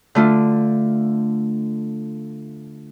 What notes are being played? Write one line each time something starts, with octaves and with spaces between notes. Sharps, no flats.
D3 A3 F4